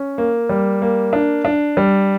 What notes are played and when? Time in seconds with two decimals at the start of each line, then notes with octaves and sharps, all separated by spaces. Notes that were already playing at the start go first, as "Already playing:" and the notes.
Already playing: C#4
0.18 A#3
0.49 G3
0.82 A#3
1.13 D4
1.45 D4
1.77 G3